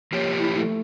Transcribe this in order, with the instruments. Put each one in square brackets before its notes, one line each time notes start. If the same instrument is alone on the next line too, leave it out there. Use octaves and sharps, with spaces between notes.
[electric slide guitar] F3 A#3 G4 [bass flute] C#5
[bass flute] E4
A3